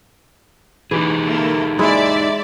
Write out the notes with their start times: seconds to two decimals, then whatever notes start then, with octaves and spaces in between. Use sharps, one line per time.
0.91 E3 D#4 G4 G#4
1.27 A#3 E4 A4
1.79 G#3 E4 D5 E5